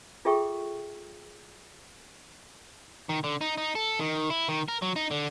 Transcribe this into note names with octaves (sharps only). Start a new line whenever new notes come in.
F4 G#4 A4 E5 G5 C#6
D#3
D3
D#4
D#4
A4
D#3
E4
D#3
A#4
F#3
D#4
D3